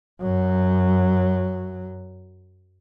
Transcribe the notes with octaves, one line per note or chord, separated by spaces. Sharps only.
F#2 F#3